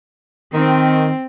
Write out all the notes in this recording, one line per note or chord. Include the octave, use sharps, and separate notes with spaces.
D#3 C4